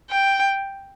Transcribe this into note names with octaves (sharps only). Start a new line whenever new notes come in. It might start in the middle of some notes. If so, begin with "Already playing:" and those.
G5